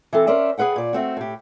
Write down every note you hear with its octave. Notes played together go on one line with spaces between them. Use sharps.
E3 C4 A4
C#4 A#4 C5 D5 E5
G#4 A#4 B4 F#5 G5
A#2 D5
A3 C4 F#4
A2 G4